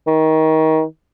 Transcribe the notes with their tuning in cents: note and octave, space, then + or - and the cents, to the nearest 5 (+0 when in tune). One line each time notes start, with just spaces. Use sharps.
D#3 +25